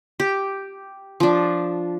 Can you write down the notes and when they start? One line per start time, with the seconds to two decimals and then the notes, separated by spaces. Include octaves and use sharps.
0.20 G4
1.20 F3 D4